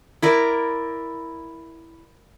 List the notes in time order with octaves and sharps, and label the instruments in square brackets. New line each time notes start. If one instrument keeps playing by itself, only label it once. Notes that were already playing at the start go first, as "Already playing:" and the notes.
[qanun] E4 A#4 D5